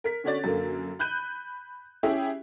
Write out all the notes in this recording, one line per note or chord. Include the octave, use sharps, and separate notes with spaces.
A#4 B6
D3 C#4 F#4 C#5 D5 A6
F#2 D3 A#3
B5 F#6 G6 D#7
C#4 E4 G4 G#4 E5